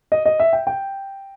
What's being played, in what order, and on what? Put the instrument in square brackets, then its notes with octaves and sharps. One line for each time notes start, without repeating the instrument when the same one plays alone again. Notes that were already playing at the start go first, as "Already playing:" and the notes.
[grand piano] D#5
D#5
E5
G5
G5